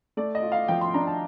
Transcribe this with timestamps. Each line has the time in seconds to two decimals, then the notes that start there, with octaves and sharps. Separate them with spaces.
0.17 A3 D5
0.35 D#5
0.42 F4
0.52 F5
0.68 F3 G5
0.81 C6
0.94 D4 A#5
1.07 A5